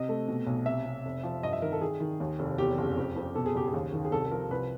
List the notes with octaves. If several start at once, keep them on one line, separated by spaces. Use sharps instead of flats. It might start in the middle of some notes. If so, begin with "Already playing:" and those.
Already playing: C3 D#5
A3
B2
B1
C3 E5
C3
F1
F3
G2 D#5
E5
D#3 A#4
A4
D#3 G#4
D#3
D#2
F1
E2 G4
F#1
F2
F2
B2 A4
G#4
F#1 G4
G#4
D#2
D#3
G#4
C2 A4
A4
F3 A#4
C2 B4